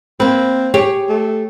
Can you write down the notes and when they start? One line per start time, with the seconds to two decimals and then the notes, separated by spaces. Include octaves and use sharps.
0.20 A#3 C4 B4
0.74 G4 G#4 C#5
1.09 A3